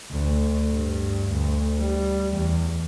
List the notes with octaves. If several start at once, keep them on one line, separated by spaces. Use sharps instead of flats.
D2
G2
D2
G3
E2